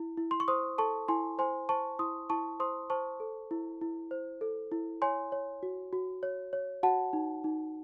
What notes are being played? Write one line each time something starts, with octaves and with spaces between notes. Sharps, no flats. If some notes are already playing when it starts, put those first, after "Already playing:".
Already playing: E4
E4
C6
C#6
C5 C6 D#6
A4 A5 C#6
E4 G#5 C6
C5 G#5 C6
C5 A5 C#6
E4 C6 D#6
E4 A5 C#6
C5 C6 D#6
C5 A5 C#6
A4
E4
E4
C5
A4
E4
C#5 G#5 C6
C#5
F#4
F#4
C#5
C#5
F#4 F#5 A5
D#4
D#4